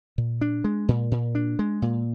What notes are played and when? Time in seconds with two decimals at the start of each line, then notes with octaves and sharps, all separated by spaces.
0.18 A#2
0.41 D4
0.64 G#3
0.88 A#2
1.11 A#2
1.35 D4
1.59 G#3
1.82 A#2